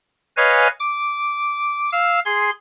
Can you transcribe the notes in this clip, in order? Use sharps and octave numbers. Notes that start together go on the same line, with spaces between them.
B4 C#5 D#5 F5 G#5
D6
F5 E6
G#4 C6